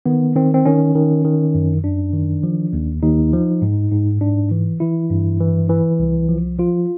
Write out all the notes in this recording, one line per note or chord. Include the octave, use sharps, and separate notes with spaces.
D#3 B3
D#3 C4
C4
D#3 C#4
D#3
D#3
F#2
F#2 D4
D#3
F3
D#2
D#2 D#4
F3
G#2
G#2
G#2 D4
E3
E3 E4
G2
E3
E3
C2
F3
F3 F4